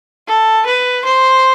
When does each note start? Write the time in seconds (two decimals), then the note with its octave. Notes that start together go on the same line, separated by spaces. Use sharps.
0.27 A4
0.66 B4
1.05 C5